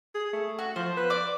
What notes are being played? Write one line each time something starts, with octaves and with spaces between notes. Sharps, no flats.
G#4
A3
F#4
F3 C5
B4
D5 D6